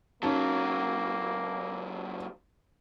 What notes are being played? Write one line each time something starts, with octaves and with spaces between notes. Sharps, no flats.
C#2 F#3 A#3 C#4 D#4 A5